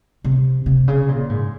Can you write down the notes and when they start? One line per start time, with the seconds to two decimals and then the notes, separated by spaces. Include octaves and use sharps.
0.24 C3
0.66 C3
0.88 C#3
1.09 A#2
1.29 G#2